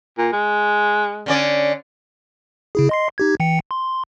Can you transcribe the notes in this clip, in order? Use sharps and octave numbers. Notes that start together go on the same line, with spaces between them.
A#2
G#3
D3 C#4 D5
C#3 E4 G#4
D#5 C6 C7
D#4 G4 G#6
E3 G5 C#7
C6